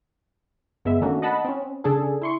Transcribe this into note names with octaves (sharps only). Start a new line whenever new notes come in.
G1 G#3 B3 E5
D#3 A3 A#3 C#4 D4 F#4
D#5 F#5 A5 B5
C4 C#4
C#3 D4 G#4 A4
E4 C6 C#6